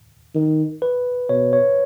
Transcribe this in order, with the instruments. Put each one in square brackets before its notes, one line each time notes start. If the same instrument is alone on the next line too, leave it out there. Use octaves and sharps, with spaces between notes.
[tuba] D#3
[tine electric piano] B4
[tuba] B2 [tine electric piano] C#5
[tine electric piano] C#5